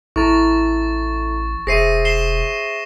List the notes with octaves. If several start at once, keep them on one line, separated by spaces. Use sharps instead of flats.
A1 E4 A4 A#5 C#6 A6
E1 G#4 C5 E5 A#6 C7 D#7
C7 E7 G7